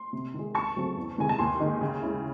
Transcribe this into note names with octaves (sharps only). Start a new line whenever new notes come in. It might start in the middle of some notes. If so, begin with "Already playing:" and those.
Already playing: C6
C3
D#3 G#3
C#2 A5 C#6
C#3 F#3 A3 C4
E2
C3 D#3 G#3 G#5
A5
D#2 G#5 C6
D#3 G#3 D#4
C#3
G#3 C#4 E4